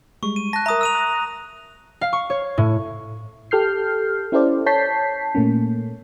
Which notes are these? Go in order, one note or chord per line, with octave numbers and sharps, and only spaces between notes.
G3 G#3 C#6
D#7
A5 F#6 A#6
A#4 E5 A#5 D#6
E6 D#7 F7
F#6 A#6
F5
C#6
C#5
A2
G4 A4 F6 G6 C7
C#4 E4 G4 A4 C5 D5
C#5 A5 G6 B6 C7
A#2 A3 A#3 C#4